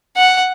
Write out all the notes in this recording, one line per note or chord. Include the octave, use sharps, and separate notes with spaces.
F#5